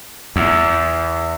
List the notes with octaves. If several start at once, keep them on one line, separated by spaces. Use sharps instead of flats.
E2